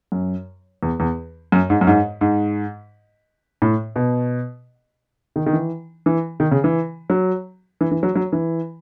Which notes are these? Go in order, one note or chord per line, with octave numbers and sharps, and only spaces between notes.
F#2
E2
E2
F#2
G#2
F#2
G#2
G#2
A2
B2
D#3
D#3
E3
E3
D#3
C#3
E3
F#3
E3
E3
F#3
F#3
E3